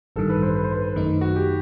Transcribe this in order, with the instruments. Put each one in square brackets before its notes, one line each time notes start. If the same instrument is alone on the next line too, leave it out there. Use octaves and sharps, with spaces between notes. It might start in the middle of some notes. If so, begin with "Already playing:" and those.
[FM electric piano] A1 G2 D#3 [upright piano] A4
[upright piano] B4
C5
B4
C5
B4
[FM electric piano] F#2 D#3 A3 D#4
[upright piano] F#4
G4